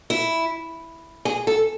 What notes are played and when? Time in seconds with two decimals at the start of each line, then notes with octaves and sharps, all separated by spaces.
0.10 E4
1.25 G#4
1.47 A4